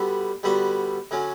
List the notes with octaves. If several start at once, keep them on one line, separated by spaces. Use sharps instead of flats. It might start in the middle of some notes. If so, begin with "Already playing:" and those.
Already playing: D3 G3 B3 F#4 A4
D3 G3 B3 F#4 A4
D3 F#3 C#4